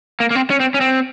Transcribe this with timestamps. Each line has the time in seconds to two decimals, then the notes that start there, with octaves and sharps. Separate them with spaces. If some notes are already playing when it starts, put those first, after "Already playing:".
0.20 A#3
0.31 A#3
0.35 C4
0.50 C#4
0.60 C4
0.74 C#4
0.81 C4